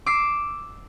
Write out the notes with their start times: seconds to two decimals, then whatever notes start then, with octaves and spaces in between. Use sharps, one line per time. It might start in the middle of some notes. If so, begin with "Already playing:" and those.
0.06 D6 E6 C7